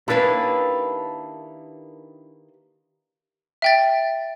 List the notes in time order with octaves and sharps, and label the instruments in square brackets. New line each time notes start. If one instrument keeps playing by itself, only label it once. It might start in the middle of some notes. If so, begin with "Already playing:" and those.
[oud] D#3 A#3 C#4 [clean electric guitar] D4 E4 [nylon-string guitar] G4 B4
[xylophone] E5 G5 A6